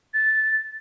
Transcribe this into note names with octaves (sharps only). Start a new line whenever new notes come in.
A6